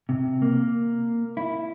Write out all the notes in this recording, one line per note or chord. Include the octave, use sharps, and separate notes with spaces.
C3
A#3
E4